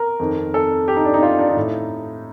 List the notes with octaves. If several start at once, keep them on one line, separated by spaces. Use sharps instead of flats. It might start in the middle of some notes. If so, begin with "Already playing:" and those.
Already playing: A#4
F2 D#3
A4
G4
D#4
D4
D#4
F4
D4
D#4
A2